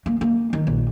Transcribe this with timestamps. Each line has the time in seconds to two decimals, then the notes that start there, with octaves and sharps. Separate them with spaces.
0.06 A#3
0.21 A#3
0.53 D#3
0.67 A#1